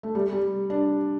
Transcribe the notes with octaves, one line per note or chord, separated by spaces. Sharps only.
A3
G3
G3
D4